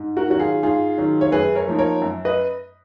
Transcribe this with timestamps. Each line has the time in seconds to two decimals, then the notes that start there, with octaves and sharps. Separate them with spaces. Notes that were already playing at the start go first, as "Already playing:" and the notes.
Already playing: G#2
0.17 F#4 A#4
0.28 D#3 F#3 C#4 F#4
0.40 F4 G#4
0.63 G#2 F4 G#4
0.98 D#3 F#3 C#4
1.21 C#5
1.32 F#2 G#4 B4
1.55 A#4 C#5
1.67 F3 A#3 D#4
1.79 A#4 C#5
2.02 F#2
2.25 B4 D#5